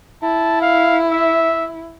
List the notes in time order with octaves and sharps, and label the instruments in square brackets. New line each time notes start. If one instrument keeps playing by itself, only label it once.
[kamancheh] E4 [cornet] A5
[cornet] F5
E5